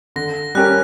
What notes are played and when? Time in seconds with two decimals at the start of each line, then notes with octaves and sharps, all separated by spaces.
0.16 D3 A#6
0.55 G3 C#4 G4 A#4 F#6